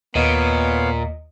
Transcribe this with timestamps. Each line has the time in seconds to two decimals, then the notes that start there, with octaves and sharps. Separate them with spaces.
0.15 D#2 A#2 B3 C#5 D#5 F5